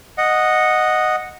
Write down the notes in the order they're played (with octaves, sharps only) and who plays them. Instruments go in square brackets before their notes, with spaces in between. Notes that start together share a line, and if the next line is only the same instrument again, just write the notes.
[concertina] D#5 F#5